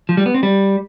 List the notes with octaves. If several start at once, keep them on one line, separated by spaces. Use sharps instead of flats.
F3
G3
B3
C4
G3